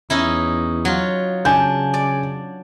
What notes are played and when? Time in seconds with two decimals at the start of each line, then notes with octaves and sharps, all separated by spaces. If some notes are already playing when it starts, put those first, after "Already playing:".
0.10 E2 C#4 D#4 E4
0.85 F#3 F4
1.45 C#3 D4 G#5 G6
1.94 D5